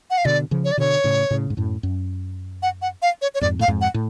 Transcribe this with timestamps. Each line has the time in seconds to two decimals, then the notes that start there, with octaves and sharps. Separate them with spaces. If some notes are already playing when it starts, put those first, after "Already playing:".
0.10 F#5
0.18 F5
0.25 B2 D3 D5
0.51 C#3 F3
0.65 C#5
0.72 D5
0.77 B2 D3 C#5
1.04 A2 C#3
1.30 A2 C#3
1.50 G#2
1.57 F#2 A2
1.83 F#2
2.62 F#5
2.82 F#5
3.02 F5
3.22 C#5
3.34 C#5
3.41 F2 G#2 D5
3.59 A2 F5
3.68 F2 G#2
3.81 F#5
3.94 A2